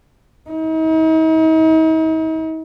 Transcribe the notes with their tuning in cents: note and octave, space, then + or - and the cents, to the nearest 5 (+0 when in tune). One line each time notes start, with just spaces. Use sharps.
D#4 +45